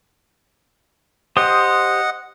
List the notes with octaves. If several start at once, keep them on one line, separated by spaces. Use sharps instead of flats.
G4 C5 D#5 F#5 D#6